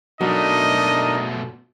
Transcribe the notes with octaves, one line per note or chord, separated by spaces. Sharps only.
B2 F#3 A3 D4 D#4 A#4 D#5